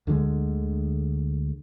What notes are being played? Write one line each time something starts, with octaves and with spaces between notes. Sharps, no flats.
D2 D3 F#3 G#3